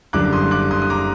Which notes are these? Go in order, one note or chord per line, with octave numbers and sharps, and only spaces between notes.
F#1 F#2 D3 G3 D6 F#6
C6 D#6
D6 F#6
C6 D#6
D#6
A#5 D6